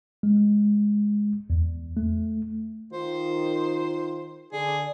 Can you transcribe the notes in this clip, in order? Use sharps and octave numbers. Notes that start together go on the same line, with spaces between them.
G#3
E2
A3
D#3 F4 C5
D3 G#4 D5